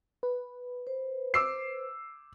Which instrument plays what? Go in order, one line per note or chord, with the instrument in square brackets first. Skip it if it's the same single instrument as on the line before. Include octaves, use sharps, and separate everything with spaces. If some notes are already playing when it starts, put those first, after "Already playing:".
[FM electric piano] B4
[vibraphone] C5
[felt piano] D6 E6 C7